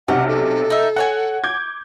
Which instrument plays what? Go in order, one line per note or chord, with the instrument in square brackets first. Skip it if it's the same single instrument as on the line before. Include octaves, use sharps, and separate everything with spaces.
[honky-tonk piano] B1 C3 [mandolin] C#4 [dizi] F#5
[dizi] A4
[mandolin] D#4 E5
[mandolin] F#4 C#5 G#5 [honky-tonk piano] F#5
[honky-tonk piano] D6 G6 G#6